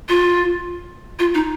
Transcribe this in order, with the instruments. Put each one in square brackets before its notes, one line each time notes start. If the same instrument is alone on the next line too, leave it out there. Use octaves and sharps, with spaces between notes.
[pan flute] F4
F4
D#4